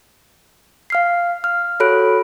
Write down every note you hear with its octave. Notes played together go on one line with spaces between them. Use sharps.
F5 F6 C7
F6
F#4 A4 C#5 B5 F#6 D7